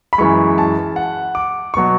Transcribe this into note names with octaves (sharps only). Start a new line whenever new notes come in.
B5
F#2 E3 G#3 C#6
A5
F#5
D6
B2 F#3 C#6